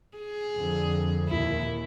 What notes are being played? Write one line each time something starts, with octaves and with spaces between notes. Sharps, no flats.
G#4
F2 D3
D#2 A#2 E4